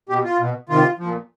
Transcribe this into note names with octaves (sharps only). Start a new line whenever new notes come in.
B2 G4
F4
B2
C3 D#3 F4
A#2 F3